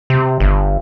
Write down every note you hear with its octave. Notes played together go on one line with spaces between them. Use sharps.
C3
G1